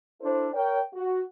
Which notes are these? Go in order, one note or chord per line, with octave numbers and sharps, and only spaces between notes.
D4 E4 A4 C5
A#4 C#5 G5
F#4